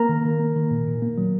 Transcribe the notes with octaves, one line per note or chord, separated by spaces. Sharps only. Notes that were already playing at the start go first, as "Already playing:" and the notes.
Already playing: A#3 A#4 A#5
D#3
D#3
A#3
D#3
A#2
A#2
A#3
F#3